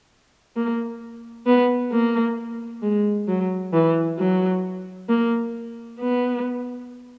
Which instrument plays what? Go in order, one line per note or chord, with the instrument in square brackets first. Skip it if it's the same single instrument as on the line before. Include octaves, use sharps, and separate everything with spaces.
[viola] A#3
B3
A#3
G#3
F#3
E3
F#3
A#3
B3